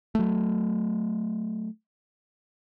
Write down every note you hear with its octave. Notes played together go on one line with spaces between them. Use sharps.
F#3 A3